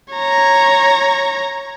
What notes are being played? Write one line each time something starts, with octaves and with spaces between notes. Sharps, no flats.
C#5 A#5